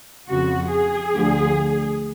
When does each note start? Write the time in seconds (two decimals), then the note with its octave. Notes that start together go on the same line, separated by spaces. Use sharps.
0.29 F2 C#3 F3 F#4
0.72 G#4
1.14 D2 D3 F3